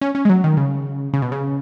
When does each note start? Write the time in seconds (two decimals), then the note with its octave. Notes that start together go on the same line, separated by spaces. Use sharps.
0.01 C#4
0.15 C#4
0.25 G#3
0.29 F#3
0.44 D#3
0.57 C#3
1.13 C#3
1.22 B2
1.32 C#3